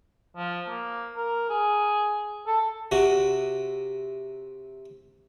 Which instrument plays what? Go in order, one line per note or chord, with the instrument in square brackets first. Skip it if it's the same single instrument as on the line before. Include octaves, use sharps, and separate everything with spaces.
[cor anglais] F3
A#3
A#4
G#4
A4
[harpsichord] C3 F#4